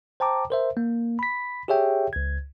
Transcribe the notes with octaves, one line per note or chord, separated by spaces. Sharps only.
C5 G5 A5 A#5 D6
A#4 C5 E5
A#3
B5 B6
G4 G#4 C#5 E5 G5
C#2 G#6